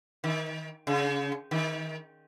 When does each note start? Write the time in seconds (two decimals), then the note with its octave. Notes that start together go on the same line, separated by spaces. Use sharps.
0.24 D#3
0.87 C#3
1.51 D#3